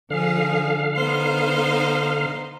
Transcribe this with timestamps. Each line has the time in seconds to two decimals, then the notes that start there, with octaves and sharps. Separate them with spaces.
0.10 D3 F3 G#4 F5
0.96 B3 D#4 C5